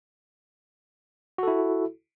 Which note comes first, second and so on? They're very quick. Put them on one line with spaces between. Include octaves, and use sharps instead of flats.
F#4 A4 E4